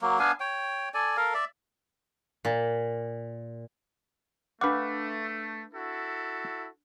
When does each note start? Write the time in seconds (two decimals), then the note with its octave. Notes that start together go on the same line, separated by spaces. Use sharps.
0.01 F#3 A#3
0.19 B3 D4 F5 G#5
0.40 C#5 G5
0.94 A4 D5 G#5
1.17 A4 A#4 F5
1.34 D5 E5
2.45 A#2
4.61 A3 D4 B4 F5 F#5 D6
5.74 E4 F#4 A4